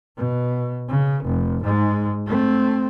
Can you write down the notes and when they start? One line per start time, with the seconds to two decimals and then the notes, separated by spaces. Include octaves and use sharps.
0.17 B2
0.89 C#3
1.25 F1
1.65 G#2 G#3
2.26 A3 C4